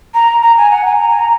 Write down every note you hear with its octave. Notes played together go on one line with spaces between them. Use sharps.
A#5
A#5
G#5
F#5
G#5
A#5
G#5
A#5